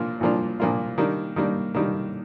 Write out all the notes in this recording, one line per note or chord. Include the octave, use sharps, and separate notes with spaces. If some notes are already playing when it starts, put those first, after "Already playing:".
Already playing: A#2 F3 A#3 D4 F4
A#2 F3 A#3 D4 F4
A#2 F3 A#3 D4 F4
D#3 G3 A#3 D4
D#3 G3 A#3 D4
D#3 G3 A#3 D4